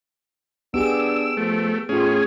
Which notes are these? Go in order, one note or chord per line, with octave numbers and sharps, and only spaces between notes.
B3 D4 G4 G#4 E6 D7
F3 A3
A2 A3 C#4 F4 G#4